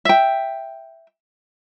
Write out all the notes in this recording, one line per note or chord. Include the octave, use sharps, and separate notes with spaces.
E5 G5